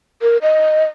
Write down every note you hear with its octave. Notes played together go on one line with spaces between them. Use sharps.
A#4
D#5